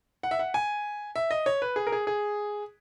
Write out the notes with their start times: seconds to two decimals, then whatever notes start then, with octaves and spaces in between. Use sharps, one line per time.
0.23 F#5
0.31 E5
0.39 F#5
0.54 G#5
1.16 E5
1.31 D#5
1.46 C#5
1.62 B4
1.76 G#4
1.87 A#4
1.92 G#4
2.07 G#4